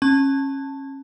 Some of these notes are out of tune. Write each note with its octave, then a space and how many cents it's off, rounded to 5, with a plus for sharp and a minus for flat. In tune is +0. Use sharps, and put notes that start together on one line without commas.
C#4 -25 A5 +10